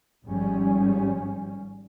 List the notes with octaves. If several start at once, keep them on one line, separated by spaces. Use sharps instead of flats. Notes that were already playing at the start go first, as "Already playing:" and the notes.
G#1 F3 G3 C#4